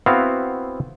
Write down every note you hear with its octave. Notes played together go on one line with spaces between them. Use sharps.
B3 C4 E4 F#4 F5